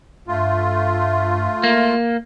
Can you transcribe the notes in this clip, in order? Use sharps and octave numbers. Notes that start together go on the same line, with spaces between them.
G2 A3 F4
A#3